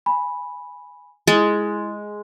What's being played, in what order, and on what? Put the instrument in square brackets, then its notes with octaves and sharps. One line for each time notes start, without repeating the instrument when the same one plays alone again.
[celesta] G#5 B5
[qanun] G#3 [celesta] E4 A6